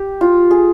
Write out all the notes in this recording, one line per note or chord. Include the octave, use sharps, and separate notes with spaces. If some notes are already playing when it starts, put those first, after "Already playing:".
Already playing: G4
F4
G#4